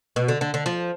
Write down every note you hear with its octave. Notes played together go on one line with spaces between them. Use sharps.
B2
D3
D3
D3
F3